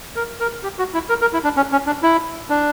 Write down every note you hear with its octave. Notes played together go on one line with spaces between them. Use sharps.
A#4
A#4
G4
F#4
E4
A#4
A#4
E4
D4
C#4
C#4
D4
E4
D4